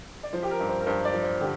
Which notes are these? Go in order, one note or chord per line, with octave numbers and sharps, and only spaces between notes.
D5
F3 C5
G4
A#4
G2
C5
A#4
G2 C5
D5
F3
C5
D3 G4